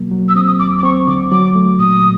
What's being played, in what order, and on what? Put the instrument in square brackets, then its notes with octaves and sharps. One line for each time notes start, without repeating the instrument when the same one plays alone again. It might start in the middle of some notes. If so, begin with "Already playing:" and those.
Already playing: [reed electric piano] B2 F#3 A#3
F#3
[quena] E6
[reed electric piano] C4 [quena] D#6
[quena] D#6
[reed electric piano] D#2 [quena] D6
[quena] D6
[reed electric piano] C4 [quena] C#6
[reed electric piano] D3 [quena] D6
[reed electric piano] F#3 [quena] D6
[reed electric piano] A3
[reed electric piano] A#2 [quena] D#6